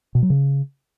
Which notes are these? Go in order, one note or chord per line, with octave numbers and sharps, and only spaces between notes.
B2
F#3
C#3